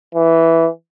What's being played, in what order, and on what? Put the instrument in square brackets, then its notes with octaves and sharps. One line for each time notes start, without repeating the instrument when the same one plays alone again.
[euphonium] E3